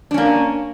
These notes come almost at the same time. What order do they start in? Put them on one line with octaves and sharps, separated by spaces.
D4 C#4 A#3